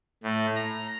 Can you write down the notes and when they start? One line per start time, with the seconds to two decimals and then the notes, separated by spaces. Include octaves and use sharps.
0.23 A2
0.55 A#5